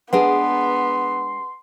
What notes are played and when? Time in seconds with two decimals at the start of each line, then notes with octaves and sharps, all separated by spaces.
0.13 G#3 B3 D4 G#4 B4 F#5 C6